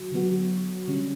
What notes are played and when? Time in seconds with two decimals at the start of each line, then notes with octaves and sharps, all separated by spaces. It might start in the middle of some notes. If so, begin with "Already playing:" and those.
Already playing: D3 F#3 F#4
0.12 D3 F#3 B3 F#4
0.88 D3 G3 C#4